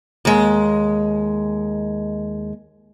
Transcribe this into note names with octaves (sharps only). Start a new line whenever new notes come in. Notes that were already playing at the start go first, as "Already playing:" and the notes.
D#2 G#3